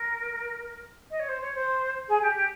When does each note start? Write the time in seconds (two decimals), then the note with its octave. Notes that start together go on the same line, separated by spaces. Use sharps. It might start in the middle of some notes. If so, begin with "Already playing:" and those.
Already playing: A#4
1.11 D#5
1.19 C#5
1.29 C5
1.41 C#5
1.55 C5
2.08 G#4
2.22 G4
2.36 G4